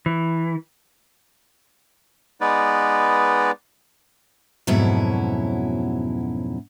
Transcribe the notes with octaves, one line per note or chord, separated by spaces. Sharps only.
E3
G#3 B3 D#4 B4 D5
F2 G#2 B2 F#3 C#4 E4